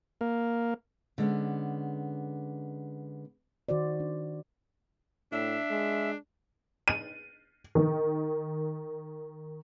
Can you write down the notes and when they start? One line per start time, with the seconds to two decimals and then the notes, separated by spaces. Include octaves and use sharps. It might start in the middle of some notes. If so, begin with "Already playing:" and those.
0.21 A#3
1.18 D3 G#3 B3 C#4
3.69 D#3 F#4 C5 D5
4.00 D4
5.32 A2 D4 E5
5.70 G#3
6.88 D#7
7.75 D#3